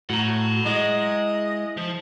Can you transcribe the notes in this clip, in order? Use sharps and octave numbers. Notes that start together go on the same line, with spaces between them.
A2 F#4 F#5 A#5
G#3 E4 D#5
F3